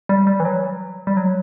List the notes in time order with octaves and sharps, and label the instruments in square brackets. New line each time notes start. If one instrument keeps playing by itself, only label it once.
[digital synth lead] G3
G3
E3
F#3
G3
F#3